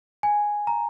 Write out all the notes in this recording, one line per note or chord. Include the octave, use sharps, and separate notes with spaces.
G#5
A#5